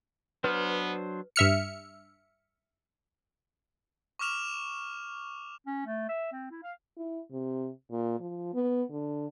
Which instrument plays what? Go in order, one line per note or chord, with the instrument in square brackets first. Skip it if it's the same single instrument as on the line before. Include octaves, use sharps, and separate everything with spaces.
[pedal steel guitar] F#3 D4 C5 [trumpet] B3 [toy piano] B4
[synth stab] G2 E5 F6 C#7
[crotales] C#6 D6 F6 E7 F7
[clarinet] C#4
A3
E5
C4
E4
F5
[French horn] E4
C3
A#2
F3
B3
D3